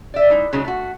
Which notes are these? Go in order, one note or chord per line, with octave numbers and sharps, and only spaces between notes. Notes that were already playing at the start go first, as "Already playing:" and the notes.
D5 E5
G#3 D#4 E4
C#3 F#3 G#3 C#4 D#4
A3 F#4